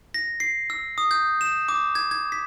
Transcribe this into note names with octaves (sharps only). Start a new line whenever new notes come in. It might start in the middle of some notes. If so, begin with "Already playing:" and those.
A#6
C7
E6
D#6
G6
E7
D6
G#6
G#6
B6